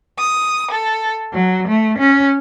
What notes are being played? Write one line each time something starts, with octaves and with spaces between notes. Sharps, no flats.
D#6
A4
F#3
A3
C#4